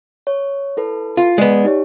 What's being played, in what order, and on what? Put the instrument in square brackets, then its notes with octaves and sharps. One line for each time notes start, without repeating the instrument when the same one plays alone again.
[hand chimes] C#5
E4 A4 B4
[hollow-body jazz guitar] F4
[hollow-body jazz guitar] G#3 B3 [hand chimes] D5
[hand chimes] D#4 G4 C#5